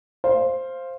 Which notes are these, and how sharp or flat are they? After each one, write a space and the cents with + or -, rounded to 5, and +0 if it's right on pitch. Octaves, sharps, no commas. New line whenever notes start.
C5 +5 F5 -10